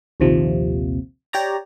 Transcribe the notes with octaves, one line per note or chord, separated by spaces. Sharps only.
A#1 D#2 C3 F3
G4 C#5 D5 A#5